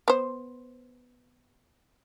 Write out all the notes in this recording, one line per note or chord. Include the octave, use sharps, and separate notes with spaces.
B3 C5